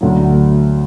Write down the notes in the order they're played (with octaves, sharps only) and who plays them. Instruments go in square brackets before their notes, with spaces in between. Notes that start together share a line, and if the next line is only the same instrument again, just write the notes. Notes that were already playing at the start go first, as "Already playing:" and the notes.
[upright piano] D2 D3 F#3